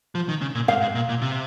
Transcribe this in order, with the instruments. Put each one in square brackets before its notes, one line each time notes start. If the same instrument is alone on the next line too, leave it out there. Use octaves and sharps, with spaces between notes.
[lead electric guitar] F3
D#3
C#3
A#2
[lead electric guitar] G#2 [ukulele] F5
[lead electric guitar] G#2
A#2
A#2
C3